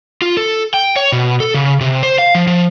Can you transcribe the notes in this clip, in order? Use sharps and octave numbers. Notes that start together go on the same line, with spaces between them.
F4
A4
G5
C#5
B2
A4
C#3
C3
C5
F5
F3
F3